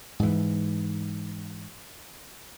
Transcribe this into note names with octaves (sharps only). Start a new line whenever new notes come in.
G#2 E3